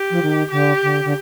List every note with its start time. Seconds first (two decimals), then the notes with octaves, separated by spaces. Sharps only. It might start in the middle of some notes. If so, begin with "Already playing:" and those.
Already playing: G4
0.10 F3
0.22 D#3
0.51 D3 G4
0.82 D3
1.04 D3